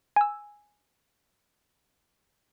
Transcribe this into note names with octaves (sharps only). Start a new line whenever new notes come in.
G#5 E6